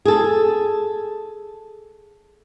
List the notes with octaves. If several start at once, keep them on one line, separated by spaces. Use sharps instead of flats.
G#4 A4